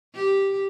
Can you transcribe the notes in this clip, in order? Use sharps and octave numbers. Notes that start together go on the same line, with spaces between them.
G4